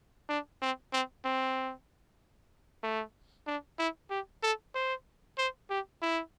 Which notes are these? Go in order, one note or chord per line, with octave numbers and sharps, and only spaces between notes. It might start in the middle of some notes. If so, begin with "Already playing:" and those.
D4
C4
C4
C4
A3
D4
E4
G4
A4
C5
C5
G4
E4